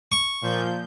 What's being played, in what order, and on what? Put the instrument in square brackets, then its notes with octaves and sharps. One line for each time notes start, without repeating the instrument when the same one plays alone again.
[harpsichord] C#6
[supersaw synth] A#2 F3 G6